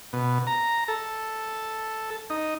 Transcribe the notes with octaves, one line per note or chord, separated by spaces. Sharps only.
B2
A#5
A4
D#4